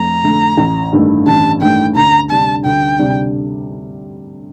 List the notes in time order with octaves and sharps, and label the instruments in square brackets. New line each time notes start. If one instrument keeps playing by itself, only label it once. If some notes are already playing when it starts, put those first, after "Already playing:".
Already playing: [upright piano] F2 A3 [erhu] A#5
[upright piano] D3 A3
A1
G2 D#3 A3
[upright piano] A1 [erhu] A5
[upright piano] G2 D#3 A3 [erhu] G5
[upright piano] D2 [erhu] A#5
[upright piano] C3 G3 D4 [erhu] A5
[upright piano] D2 [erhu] G5
[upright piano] C3 G3 D4